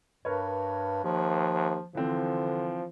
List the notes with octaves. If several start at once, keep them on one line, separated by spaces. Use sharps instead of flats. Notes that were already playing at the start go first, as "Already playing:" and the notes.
G2 A#4 B4 C#5
D#2 F3
D3 E3 F3 C4